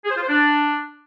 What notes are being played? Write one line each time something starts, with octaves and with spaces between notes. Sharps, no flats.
G#4
C5
F4
C5
D4